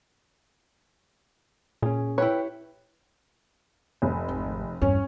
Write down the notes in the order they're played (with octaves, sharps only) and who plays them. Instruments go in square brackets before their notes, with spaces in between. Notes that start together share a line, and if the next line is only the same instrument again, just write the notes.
[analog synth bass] A#2 [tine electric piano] C#4 G#4
[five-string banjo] E4 G4 C#5 [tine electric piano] B4 G5
[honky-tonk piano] F1
[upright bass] G#1
[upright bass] E2 G2 [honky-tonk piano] C#4